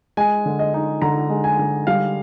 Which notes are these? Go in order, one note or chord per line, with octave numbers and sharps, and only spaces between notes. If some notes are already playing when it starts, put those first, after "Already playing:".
G#3 G#5
D3
D#5
D#4
D3 A#5
G#3
G#5
D3
G3 F5